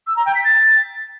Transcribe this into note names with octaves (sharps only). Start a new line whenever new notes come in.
E6
A#5
G5
B6
A6